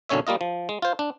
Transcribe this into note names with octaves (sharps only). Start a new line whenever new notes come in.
B1 F#2 D3 C#4 C#5 E5
G3 A#3 F4 D#5
F3
G#3
F4 C5
D4